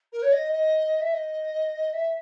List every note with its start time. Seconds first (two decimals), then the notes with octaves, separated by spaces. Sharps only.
0.12 A#4
0.22 C#5
0.33 D#5
0.53 D#5
1.01 E5
1.13 D#5
1.93 E5